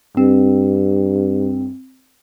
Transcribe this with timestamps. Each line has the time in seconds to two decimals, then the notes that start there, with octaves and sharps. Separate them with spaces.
0.17 G2 C4